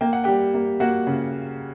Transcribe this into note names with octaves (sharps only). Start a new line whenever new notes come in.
A#3 G5
F#5
G3 G4 G5
A#3
A#3 F#4 F#5
C#3